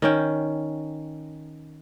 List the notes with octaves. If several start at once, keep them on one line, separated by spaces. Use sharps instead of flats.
D#3 C#4 G5